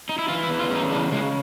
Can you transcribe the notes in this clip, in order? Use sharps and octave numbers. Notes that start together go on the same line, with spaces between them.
D#4
E4
E3 F4
E4
E2
F4
C#3
D#4
E2 D4
C#3 G#3